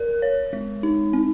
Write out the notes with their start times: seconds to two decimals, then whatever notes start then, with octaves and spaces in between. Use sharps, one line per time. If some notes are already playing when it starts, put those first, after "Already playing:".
Already playing: A#4
0.22 C#5
0.53 G#3
0.83 D#4
1.13 C4